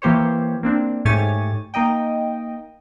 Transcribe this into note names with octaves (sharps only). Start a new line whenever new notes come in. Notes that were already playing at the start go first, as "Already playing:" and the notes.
E3 A#3 G4 C5 C#5
A#3 C4 D4
G#2 A3 G4 C#5 G#5 A6
A#3 D#4 D#5 G5